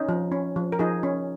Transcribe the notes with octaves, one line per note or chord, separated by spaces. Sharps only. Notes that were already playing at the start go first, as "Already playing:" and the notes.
Already playing: C#4 D#4
F3
C#4
F3
A#4
F3 D#4 G#4
C#4